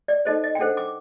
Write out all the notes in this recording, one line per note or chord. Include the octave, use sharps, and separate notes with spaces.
D5
D#4 A4 C5 D#5
D#5
G5
D4 A4 C5 F#5
D6